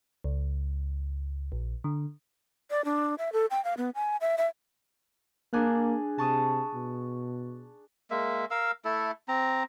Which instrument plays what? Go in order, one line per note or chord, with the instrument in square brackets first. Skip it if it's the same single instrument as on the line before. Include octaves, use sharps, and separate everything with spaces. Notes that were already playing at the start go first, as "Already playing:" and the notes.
[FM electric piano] C#2
A#1
D3
[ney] D5
D4
E5
A4
G5
F5
B3
G#5
E5
E5
[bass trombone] A#3 [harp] D4 G#4 F#6
[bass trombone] C3 [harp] A5 C#6 D#6
[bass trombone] B2
[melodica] G#3 A#3 E5
A#4 F5 E6
A3 E4 A4
C4 A#5